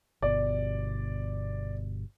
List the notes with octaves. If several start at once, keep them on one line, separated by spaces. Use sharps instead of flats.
G1 B2 D5